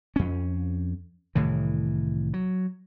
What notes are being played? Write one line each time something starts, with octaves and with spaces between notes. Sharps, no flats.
F2 C#4
C2 A2 D#3 E3
F#3